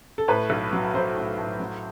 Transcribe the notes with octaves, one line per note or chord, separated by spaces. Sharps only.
A4
A2 B4
B1
F#3
F#3 C5
A2
A2
F#3